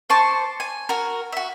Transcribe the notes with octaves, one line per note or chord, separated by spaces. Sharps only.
C5 A5 C#6 D6
G#5
F#4 A#4
F#4 E5